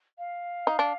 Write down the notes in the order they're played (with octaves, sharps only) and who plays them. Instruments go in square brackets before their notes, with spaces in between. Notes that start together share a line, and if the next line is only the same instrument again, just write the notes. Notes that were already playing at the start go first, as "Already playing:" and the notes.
[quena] F5
[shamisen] D#4
D4